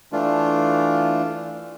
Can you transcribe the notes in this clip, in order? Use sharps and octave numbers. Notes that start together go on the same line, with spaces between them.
E3 A3 D4 F4